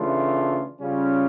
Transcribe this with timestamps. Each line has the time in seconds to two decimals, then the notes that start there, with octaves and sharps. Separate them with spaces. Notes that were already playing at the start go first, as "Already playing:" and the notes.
Already playing: C#3 E3 A3 D4 F4
0.80 C#3 G3 C#4 F4